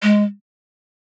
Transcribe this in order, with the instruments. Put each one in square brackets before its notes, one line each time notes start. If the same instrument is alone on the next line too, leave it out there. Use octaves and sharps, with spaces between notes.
[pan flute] G#3